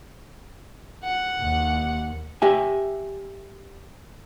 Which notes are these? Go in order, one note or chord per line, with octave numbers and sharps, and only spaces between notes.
F#5
D#2
G4 E5 G#5